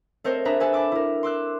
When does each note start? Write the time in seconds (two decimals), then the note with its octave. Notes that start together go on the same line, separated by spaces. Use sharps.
0.24 A3 C4 A#4 C5 C#5 D#5
0.45 D4 G#4 B4 E5 A#5
0.60 A4 B4 E5 G#5
0.73 A5 B5 D6 E6
0.92 E4 A#4
1.23 C6 D6 E6 F#6